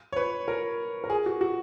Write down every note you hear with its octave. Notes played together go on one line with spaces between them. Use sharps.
C#5
B4
A#4
A#4
G#4
F#4
F#4